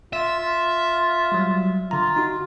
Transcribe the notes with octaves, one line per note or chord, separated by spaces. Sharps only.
F4 E5
F4
F#3 G3
D3 F4 A#5
D#4 F#4